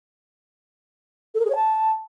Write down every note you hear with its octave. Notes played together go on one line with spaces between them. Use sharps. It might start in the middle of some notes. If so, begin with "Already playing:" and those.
A4
A#4
G#4
C#5
A5